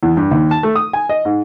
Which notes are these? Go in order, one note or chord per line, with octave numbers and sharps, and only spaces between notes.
E2
G2
D#2
A5
A3
D#6
G#5
D#5
G#2